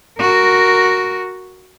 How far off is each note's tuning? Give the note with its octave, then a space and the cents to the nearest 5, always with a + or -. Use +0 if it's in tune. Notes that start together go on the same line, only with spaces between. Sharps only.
F#4 +0 A#4 +0